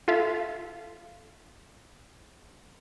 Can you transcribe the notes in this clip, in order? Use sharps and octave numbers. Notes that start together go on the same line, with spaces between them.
F4 A4 E5 F5